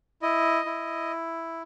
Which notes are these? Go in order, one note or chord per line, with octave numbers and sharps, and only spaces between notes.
E4 D#5
E4